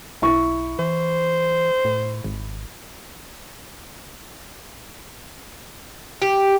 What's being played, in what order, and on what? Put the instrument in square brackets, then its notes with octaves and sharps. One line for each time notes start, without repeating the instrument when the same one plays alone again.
[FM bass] B1 [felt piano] E4 C#6
[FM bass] E3 [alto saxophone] C5
[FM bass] A2
G#1
[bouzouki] G4